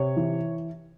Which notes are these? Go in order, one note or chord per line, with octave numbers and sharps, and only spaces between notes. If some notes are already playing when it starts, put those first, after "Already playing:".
Already playing: C3 C#5
E3